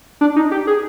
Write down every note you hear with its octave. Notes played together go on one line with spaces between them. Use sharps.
D4
D#4
G4
G#4